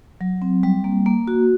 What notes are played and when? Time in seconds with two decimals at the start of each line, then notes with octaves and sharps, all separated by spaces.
0.21 F#3
0.42 C4
0.63 G3
0.84 A#3
1.06 A#3
1.28 F#4